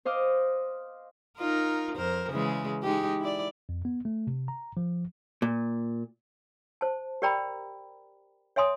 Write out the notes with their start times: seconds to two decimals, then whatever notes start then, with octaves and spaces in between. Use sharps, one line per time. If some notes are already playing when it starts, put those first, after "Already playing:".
0.05 C5 D#5 F5 D6
1.38 D#4 F4 A#4
1.95 F2 A#4 C5
2.30 C#3 E3 G#3
2.83 G#3 D#4 G4
3.20 E4 D5
3.69 F2
3.85 B3
4.05 A3
4.27 C3
4.48 A#5
4.77 F3
5.42 A#2
6.81 C5 A5
7.22 G4 A#4 D5 G5 A#5 B5
8.56 C#5 E5 G#5 C6 D#6